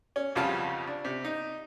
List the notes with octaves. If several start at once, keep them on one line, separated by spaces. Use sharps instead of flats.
C#4
B1 F2 C#3 G3 F4 A5
D4
C3
D#4